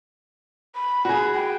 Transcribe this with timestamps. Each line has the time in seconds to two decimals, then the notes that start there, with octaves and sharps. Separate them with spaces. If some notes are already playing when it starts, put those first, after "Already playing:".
0.75 B5
1.05 F#4 G#4
1.33 G5